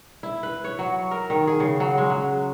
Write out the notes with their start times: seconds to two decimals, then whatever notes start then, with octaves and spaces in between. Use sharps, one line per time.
0.23 E4
0.43 B4
0.64 C#5
0.79 F#3
1.11 A#4
1.30 D#3
1.47 G#4
1.60 C#3
1.80 F#3
1.98 G#3
2.10 F#3